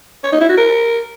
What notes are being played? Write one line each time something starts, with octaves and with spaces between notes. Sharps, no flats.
C#5
D#4
E4
F#4
A#4